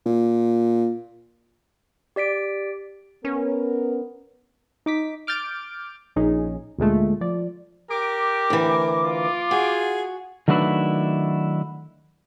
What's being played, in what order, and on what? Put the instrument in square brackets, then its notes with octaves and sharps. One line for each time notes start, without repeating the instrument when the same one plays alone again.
[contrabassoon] A#2
[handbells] G4 D5 B6 D7
[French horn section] B3 A#4 [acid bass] C#4
[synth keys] D#4 D6 B6
D6 F6 G6 A6 D7
A#1 C#4 D#4 G#4
D2 A#2 G#3 A3
F3 D5
[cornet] G4 [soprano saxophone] A#4 [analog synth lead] D6
[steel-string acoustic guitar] D2 E3
[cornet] F4
[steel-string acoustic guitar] F#4 [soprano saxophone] G#4
[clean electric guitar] D#3 F#3 A3 D4 E4 B4